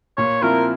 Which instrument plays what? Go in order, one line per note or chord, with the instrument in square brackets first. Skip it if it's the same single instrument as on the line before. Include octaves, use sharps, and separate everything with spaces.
[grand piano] A#2 [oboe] C#5
[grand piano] F3 C4 E4 [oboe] A#4